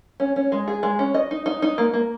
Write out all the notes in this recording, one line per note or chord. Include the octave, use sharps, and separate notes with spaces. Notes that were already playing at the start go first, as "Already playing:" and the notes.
C#4
C#4
G#3
G#4
G#3
C#4
D#5
D#4
D#4
D#4
A#3
A#3